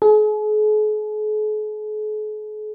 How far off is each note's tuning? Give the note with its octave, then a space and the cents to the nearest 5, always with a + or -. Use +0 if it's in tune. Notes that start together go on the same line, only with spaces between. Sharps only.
G#4 +45